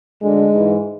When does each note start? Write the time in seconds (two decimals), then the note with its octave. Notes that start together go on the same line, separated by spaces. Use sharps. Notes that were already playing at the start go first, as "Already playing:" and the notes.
0.21 D2 D3 G#3
0.52 G#2 E3